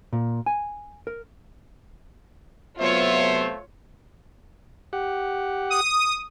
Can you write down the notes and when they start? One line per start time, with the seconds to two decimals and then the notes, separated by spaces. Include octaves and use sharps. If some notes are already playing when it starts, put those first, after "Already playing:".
0.13 A#2
0.46 G#5
1.07 A#4
2.79 C3 F#3 A3 B3 F4 C5 C#5 E5
4.93 G4 F#5
5.70 D#6